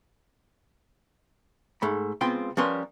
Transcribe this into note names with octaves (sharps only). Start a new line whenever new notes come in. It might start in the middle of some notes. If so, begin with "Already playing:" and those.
G#2 A3 B5
C#2 B3 C4 F4 G5 C6
F3 G3 C#4 A#4 B4 C6